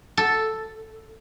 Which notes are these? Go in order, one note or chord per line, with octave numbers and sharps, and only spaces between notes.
A4